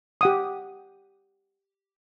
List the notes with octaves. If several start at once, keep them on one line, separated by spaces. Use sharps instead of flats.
G4 F#5 D#6